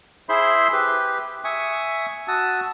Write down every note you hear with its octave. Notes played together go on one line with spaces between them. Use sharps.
E4 G#4 C5 E5 B5 C6
G4 B4
E5 G#5 C#6 D#6
F#4 A5 D#6 E6